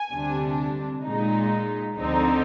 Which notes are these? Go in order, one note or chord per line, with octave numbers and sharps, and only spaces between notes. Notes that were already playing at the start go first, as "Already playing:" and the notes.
Already playing: G#5
D2 C3 G3 D4
A#2 G#3 D#4
D2 D3 F3 C4 D#4